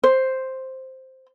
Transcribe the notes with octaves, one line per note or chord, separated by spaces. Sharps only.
C5